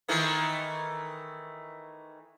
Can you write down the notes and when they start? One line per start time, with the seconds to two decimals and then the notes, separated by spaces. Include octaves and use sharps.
0.08 D#3 E3 A3